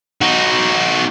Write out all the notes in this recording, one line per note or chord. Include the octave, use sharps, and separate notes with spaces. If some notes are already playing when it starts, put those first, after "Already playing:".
D#4 F#4